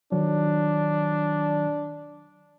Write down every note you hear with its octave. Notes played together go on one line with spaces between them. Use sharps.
D#3 F#3 D4